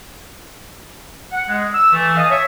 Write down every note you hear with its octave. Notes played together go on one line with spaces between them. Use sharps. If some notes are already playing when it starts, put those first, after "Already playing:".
F#5
G#3
E6
E3 A3
D#5 F5 G#5 A5 D#6
C#5 E5